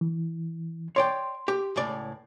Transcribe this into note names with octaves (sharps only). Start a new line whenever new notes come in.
E3
C#5 D5 G5 C6
G4
C#2 A2 D5